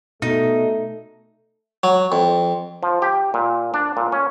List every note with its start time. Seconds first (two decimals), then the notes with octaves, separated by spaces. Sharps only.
0.22 B2 A3 D#4
1.83 F#3
2.12 F2
2.83 F3
3.02 G4
3.34 A#2
3.74 D4
3.97 A#2
4.12 C#4